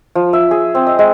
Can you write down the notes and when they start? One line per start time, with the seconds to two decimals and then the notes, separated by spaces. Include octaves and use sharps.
0.15 F3
0.33 E5
0.51 G#4
0.75 C4
0.87 D#5
0.99 G#3